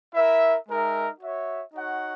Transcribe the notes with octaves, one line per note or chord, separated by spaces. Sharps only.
E4 A#4 E5
G#3 D#4 A#4 E5
F#4 C#5 E5
D#4 F#4 C#5 F#5